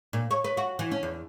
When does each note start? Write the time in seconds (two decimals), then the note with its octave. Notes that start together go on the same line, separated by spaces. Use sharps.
0.13 A#2
0.31 C#5
0.44 B4
0.57 F#4
0.79 E3
0.91 C#4
1.03 E2